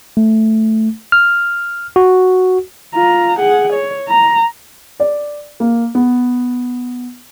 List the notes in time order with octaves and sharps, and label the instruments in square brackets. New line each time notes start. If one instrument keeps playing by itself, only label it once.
[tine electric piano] A3
F6
F#4
[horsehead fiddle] F4 A#5
G#4 F#5
C#5
A#5
[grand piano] D5
A#3
B3